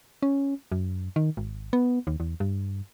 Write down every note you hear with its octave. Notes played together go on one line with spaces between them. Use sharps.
C#4
F#2
D#3
G#1
B3
D#2
E2
G2